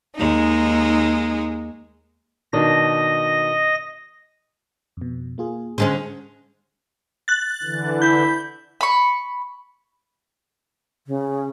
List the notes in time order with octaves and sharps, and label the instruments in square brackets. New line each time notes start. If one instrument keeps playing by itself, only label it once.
[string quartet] D#2 G#3 D#4
[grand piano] B2 D#3 D4 [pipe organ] D#5 A#6
[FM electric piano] F2 B2
A#3 F4 G#4
[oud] D3 G#3 C#4 [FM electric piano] C5 F6
[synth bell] F#6 A6
[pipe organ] D3 E3
[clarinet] E4 [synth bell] G6
[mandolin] B5 C#6
[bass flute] C#3